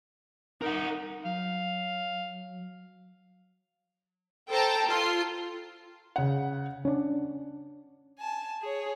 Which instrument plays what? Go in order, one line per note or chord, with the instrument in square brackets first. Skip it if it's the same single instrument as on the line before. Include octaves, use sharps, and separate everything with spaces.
[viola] D#4 [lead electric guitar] A#4 F#5
[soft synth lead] F#3 [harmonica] F5
[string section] A4 C5 G5 A5 A#5
F4 A4 C6
[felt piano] C#3 F#5
[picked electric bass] C#4 D4
[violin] G#5 A5
G#4 C#5